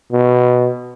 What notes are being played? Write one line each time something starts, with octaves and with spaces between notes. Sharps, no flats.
B2